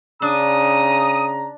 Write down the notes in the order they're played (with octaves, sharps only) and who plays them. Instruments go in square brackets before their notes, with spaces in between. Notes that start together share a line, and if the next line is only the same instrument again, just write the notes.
[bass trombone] C#3 [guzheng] D4 [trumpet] A#5 [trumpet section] D#6